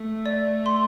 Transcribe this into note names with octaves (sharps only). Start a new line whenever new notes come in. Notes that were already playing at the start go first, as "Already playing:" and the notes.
Already playing: A3
D5
C6